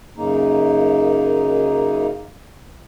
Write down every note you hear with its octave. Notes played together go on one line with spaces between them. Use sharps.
F#2 C#3 A#3 D#4